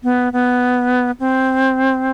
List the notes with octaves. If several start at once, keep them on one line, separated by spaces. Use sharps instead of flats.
B3
B3
C4